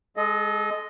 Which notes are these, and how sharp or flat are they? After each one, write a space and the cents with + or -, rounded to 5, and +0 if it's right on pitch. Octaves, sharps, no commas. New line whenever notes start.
G#3 +0 A4 -35 D#5 +0